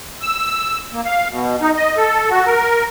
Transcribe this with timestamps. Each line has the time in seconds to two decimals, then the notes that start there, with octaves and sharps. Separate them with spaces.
0.22 E6
0.93 A#3
1.05 F5
1.31 B2
1.61 D#4
1.76 D#5
1.97 A4
2.30 F#4
2.46 A#4